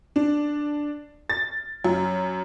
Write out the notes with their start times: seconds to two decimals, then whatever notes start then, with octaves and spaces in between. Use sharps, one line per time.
0.16 D4
1.30 A6
1.84 F#2